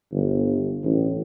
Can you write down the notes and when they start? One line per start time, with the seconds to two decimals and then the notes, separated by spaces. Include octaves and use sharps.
0.12 G1
0.83 A1